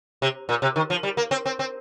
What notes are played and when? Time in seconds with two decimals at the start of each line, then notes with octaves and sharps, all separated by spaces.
0.22 C3
0.49 A#2
0.62 C3
0.76 D#3
0.90 F3
1.03 G3
1.17 A#3
1.31 C4
1.46 C4
1.59 C4